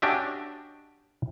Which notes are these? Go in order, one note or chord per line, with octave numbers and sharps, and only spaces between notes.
C#4 D4 F#4 G4 D#5 E5